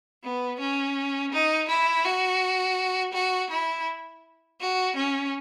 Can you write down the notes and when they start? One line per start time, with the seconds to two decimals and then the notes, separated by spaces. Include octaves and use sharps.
0.23 B3
0.60 C#4
1.32 D#4
1.69 E4
2.05 F#4
3.14 F#4
3.50 E4
4.60 F#4
4.96 C#4